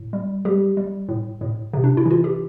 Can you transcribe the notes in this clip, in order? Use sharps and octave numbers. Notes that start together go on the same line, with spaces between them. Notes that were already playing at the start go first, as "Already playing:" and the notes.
Already playing: A2
G3
G3 G4
G3
A2
A2
C3
D4
E4
E3 F4
G4